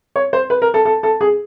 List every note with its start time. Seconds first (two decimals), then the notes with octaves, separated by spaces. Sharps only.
0.16 C#5
0.33 C5
0.50 B4
0.62 A#4
0.74 A4
0.85 A4
1.03 A4
1.21 G#4